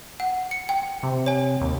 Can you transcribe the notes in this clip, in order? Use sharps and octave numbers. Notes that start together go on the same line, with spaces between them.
F#5
C#7
G5
C3
C#5 G#5
D#2